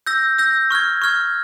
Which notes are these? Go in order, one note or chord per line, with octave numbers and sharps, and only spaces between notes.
E6 G6 A#6
E6 G6 A#6
C#6 F6 G#6
C#6 F6 G#6